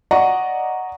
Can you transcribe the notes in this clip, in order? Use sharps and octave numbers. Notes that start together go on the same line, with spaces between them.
D5 D#5 F#5 A#5 C#6